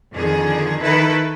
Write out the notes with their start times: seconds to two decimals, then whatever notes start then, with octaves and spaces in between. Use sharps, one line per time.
0.14 F2 D3 D#3 G#4
0.82 D#3 E4 A4 B4